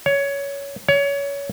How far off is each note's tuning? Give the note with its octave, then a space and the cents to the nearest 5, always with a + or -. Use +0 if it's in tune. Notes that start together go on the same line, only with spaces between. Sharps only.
C#5 +15
C#5 +25